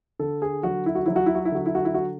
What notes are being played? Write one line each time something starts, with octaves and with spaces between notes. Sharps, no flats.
D3 A4
G#4
F#3 F#4
E4
F#4
F#3 E4
F#4
E4
F#4
E4
D3 F#4
E4
F#4
E4
F#4